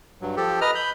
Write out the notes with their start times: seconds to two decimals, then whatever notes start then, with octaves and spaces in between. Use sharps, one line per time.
0.21 G2 F#3
0.37 F3 G4 A4
0.61 B4 D#5 A#5 F6
0.75 B5 G6